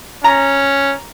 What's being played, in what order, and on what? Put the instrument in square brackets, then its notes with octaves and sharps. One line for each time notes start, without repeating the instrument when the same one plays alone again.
[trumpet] C#4 [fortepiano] A#5